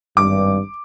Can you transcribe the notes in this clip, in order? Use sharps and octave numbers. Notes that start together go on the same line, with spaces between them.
G#1 G2 D6